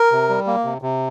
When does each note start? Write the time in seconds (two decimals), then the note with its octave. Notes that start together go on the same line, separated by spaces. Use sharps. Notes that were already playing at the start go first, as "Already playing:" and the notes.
Already playing: A#4
0.12 C3
0.29 G3
0.47 A#3
0.65 C3
0.82 C3